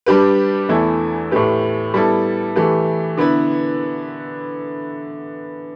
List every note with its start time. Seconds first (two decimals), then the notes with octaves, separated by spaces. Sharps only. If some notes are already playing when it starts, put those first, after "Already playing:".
0.06 G3 D4 G4 B4
0.69 E2 E3 A3 E4
1.31 A2 A3 G4 B4
1.94 G3 B3 E4 A4
2.56 E3 A3 G4 B4
3.18 D3 B3 E4 B4